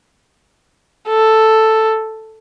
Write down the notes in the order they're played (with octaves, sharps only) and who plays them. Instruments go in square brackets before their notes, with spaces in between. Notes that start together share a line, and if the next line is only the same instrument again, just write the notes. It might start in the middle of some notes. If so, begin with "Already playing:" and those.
[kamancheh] A4